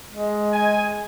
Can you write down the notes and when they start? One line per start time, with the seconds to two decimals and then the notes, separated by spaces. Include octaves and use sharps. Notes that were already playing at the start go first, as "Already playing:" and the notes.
0.10 G#3
0.53 G#5